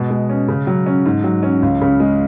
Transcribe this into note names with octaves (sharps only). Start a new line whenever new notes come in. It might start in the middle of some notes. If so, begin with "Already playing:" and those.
Already playing: B2 G#3
G#3
C#4
C#3
F#3
C#4
G#2
F#3
C#4
C#2
C#3
G#3